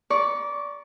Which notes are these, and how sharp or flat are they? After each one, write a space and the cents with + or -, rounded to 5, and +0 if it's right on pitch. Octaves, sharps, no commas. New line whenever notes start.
D5 -20 A#5 +35 C#6 +0